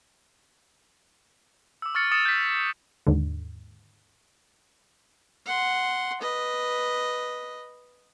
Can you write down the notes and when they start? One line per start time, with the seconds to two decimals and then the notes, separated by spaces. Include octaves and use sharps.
1.82 D6 E6
1.95 C#6 F6 A6 C#7
2.12 D#6 A6 C#7 E7
2.25 G6 B6
2.50 E7
3.07 D#2 G#2 D3
5.46 F#5 C6
6.21 B4 D#5